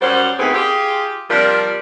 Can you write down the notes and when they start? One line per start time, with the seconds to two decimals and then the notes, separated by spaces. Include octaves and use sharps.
0.02 F#2 G3 C#4 F#4 C5
0.39 D#2 E3 A3 B3 C4 G#4
0.54 F4 G4 G#4
1.30 C3 F3 G3 D4 F4 A#4